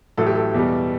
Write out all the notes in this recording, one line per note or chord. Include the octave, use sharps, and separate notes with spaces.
A1 A2 F#3 A4
G4
A4
E2 B2 G3